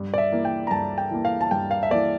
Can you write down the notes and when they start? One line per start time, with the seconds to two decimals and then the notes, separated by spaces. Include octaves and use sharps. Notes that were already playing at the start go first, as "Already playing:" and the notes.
Already playing: G2
0.14 D5
0.18 E5
0.32 E3 A#3
0.45 G5
0.67 A#5
0.71 G2 A5
0.98 G5
1.11 E3 A#3
1.25 F5
1.41 A5
1.51 G2 G5
1.71 F5
1.83 E5
1.90 A#3 D5
1.94 E3